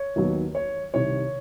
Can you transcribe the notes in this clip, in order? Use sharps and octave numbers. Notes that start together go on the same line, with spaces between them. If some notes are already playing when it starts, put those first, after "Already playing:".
Already playing: C#5
D#2 D#3 F#3 B3
C#5
C2 C3 D#3 C#5